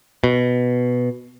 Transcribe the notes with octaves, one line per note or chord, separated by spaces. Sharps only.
B2